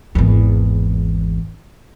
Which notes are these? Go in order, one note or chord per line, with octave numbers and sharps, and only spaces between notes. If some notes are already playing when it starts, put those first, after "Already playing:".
G#1 E2